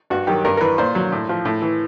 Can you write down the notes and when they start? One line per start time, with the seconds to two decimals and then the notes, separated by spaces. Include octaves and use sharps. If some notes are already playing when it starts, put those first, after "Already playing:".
0.10 G2 F#4
0.27 D#3 F#3 G4
0.45 G2 A#4
0.57 A#4
0.61 E3 B4
0.78 A#2 C5
0.95 F#3
1.12 A2
1.29 F3
1.45 A2
1.62 E3